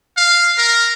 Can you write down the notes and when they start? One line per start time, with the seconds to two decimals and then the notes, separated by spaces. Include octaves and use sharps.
0.17 F5
0.58 A#4